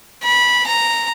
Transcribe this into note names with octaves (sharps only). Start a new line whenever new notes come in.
B5
A#5